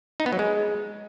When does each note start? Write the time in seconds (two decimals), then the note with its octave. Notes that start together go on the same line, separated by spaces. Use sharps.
0.20 D#4
0.26 B3
0.33 F#3
0.39 G#3